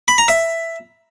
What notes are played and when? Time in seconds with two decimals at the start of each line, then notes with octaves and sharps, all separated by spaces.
0.08 B5
0.18 A#5
0.28 E5